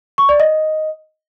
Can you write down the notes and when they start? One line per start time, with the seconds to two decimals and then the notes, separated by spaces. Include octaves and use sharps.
0.18 C#6
0.29 D5
0.40 D#5